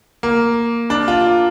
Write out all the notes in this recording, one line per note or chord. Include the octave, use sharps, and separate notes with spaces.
A#3
D4
F4